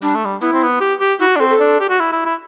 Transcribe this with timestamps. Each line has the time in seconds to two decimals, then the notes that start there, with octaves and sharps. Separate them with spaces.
0.02 G3 D4
0.14 A3
0.25 G3
0.41 B3 E4
0.53 C4
0.63 B3
0.80 G4
1.00 G4
1.19 E4 F#4
1.36 D4
1.40 C4 A4
1.50 A4
1.59 D4
1.80 G4
1.89 F#4
1.99 E4
2.12 E4
2.25 E4